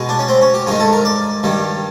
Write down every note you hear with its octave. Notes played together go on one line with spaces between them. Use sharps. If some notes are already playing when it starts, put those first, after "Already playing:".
Already playing: B2 G#3
D4
C#4
C4
C#4
G4
G2 D#3 G#3 G#4
A4
A#4
D5
G2 D#3 G3